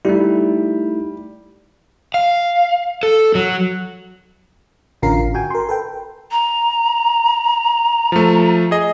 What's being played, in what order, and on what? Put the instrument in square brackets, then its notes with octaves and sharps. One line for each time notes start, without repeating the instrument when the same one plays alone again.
[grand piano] G3 [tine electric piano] A3 D#4 E4
[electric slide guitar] F5
A4
F#3
[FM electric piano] A1 D3 C#4 F4 A#4 C7
G#1
F#4 G5 G#5
A#4 C6
A4 B4 G5
[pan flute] A#5
[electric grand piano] F3 A3
G#4 D#5